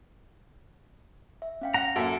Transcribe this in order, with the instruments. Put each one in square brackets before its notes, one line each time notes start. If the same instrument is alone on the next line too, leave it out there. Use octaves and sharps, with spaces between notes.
[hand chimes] E5
C#4 F5 G5
[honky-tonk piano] F#5 [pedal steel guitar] A#5
[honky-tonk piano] F#2 A#3 E5 [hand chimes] F#4 F#5 D7 [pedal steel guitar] A4